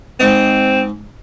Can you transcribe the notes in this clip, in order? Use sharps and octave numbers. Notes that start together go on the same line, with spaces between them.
G#2 C4 D#5 D#6